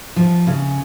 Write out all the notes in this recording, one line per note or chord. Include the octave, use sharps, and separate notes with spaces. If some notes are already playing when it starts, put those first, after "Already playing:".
F3
C#3